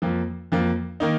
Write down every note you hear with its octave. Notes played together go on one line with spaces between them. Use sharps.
F2 F3 A#3
F2 F3 A#3
D#3 A#3 D#4